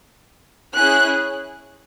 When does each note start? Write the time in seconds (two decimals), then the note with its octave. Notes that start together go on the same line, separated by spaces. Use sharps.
0.74 C#4 E4 G#4 F#6